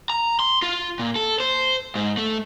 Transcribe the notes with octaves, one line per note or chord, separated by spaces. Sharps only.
A#5
C6
F4
A#2
A4
C5
G#2
A3